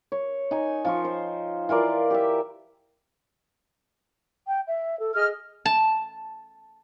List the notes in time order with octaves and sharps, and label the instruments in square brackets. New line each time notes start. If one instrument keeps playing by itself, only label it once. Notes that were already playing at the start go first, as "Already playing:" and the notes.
[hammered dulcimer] C#5
D#4 G#5
F3 F4 C#6
C5
E3 F4 A#4 D5
G4 E5
[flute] G5
E5
A4
[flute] G#4 [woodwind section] D#5 F6
[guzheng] A5